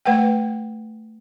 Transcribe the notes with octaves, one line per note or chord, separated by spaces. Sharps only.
A3 B4 F#5 G5